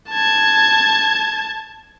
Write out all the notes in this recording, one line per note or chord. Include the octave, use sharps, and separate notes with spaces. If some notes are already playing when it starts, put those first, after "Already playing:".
A5 G#6